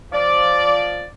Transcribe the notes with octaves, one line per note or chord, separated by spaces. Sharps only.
F3 D5